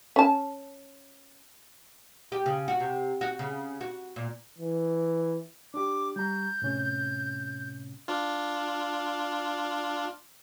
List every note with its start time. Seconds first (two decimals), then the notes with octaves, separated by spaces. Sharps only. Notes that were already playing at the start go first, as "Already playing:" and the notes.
0.16 C#4 A5
2.32 G4
2.46 C#3
2.68 F#4
2.80 C3
3.21 F#4
3.39 C#3
3.81 F#4
4.16 A#2
4.58 E3
5.74 D4 G4 D6
6.16 G3 A#5 G6
6.62 A2 C3 C#4
8.08 D4 F4